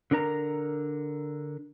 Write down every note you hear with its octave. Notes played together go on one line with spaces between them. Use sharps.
D3 D4 A#4 A#5